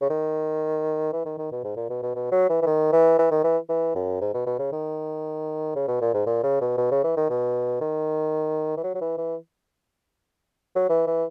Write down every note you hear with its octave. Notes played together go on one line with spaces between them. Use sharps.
C#3
D#3
E3
D#3
D#3
B2
G#2
A#2
B2
B2
B2
F#3
E3
E3
D#3
E3
E3
D#3
E3
E3
F#2
G#2
B2
B2
C#3
D#3
C#3
B2
A#2
G#2
A#2
C#3
B2
B2
C#3
E3
D#3
B2
D#3
E3
F#3
F#3
E3
E3
F#3
E3
E3